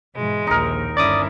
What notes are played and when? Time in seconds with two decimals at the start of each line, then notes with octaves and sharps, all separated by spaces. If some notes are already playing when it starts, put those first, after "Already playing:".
0.14 G#2 B2 E3 G#3
0.47 A#1 D#2 D#4 A#4
0.97 G1 C#4 D4 E4 D5 D6 D#6